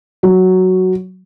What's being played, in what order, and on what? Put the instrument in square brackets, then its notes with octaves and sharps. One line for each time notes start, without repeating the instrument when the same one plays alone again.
[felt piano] F#3